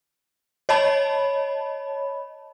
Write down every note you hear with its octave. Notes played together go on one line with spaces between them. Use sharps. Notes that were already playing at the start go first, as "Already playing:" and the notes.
C#5 D#5 A5 B5